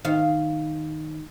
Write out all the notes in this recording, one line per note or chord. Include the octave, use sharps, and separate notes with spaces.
D#3 F5